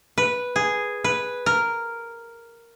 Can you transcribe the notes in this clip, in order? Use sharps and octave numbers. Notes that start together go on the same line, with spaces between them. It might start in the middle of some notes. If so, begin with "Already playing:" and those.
B4
G#4
B4
A#4